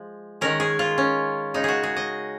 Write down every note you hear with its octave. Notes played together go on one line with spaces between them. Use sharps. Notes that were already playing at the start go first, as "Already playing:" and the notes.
Already playing: F3 G#3
D#3 G#3 C#4 A#4
G#4
F4
C#4
C#3 G#3 C#4 D#4
F#4 G#4
G#4
D#5